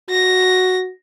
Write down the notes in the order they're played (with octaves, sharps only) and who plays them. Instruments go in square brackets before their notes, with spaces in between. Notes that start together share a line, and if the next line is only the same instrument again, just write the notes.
[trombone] F#4 [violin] A#6